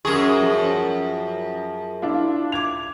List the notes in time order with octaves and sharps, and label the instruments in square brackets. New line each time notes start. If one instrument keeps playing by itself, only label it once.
[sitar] F#2 G#4 [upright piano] C#6
[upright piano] F3
D4 E4 F4
D6 G#6 F7